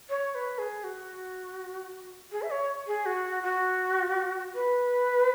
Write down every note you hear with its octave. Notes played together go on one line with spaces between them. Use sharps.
C#5
B4
G#4
F#4
G#4
E5
C#5
G#4
F#4
F#4
B4